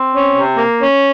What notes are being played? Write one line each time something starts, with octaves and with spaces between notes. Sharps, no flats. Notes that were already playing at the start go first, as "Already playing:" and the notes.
Already playing: C4
C#4
C3
A#3
C#4